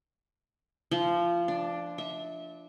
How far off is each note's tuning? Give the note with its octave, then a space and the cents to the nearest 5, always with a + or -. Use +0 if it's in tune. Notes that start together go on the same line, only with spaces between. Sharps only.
F3 -20
D4 +5
E5 -30